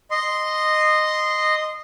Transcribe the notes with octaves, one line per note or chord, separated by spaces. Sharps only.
D#5 C6